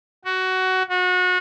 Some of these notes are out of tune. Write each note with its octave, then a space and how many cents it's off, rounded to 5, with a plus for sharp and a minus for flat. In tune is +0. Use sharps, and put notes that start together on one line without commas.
F#4 +15
F#4 -30